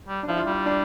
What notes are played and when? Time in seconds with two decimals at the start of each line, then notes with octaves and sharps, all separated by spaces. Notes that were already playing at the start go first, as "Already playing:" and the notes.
0.08 G3
0.23 D4
0.28 F3 E4
0.37 F4
0.46 G3 E4
0.66 D4